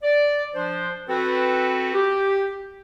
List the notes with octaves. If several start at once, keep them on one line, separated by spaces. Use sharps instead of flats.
D5
F3 D4 C5
C4 F#4 A4 B4
G4